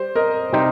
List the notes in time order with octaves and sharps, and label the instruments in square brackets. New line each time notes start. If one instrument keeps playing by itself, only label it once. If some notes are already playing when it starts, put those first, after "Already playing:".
Already playing: [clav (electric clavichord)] G3 [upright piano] G4 C5
[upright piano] A#4 D#5
[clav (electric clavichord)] C3 G3 D#4 G4 C5